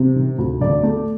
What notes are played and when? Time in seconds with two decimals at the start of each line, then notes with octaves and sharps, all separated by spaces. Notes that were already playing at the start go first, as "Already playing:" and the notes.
Already playing: C3
0.16 D#3
0.38 D2
0.61 D3 D5
0.83 A3